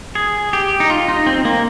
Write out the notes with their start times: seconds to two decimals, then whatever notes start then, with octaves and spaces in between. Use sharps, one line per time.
0.15 G#4
0.53 G4
0.80 D#4
0.90 F4
1.08 D#4
1.27 C4
1.45 A#3